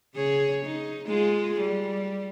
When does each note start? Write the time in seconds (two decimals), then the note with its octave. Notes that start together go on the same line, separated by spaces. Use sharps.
0.15 C#3 G#4 C#5
0.66 D#4
1.07 G#3 F4 G#4
1.61 G3